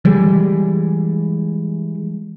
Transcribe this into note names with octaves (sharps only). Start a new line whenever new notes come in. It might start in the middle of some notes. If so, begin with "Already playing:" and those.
E3 G3 G#3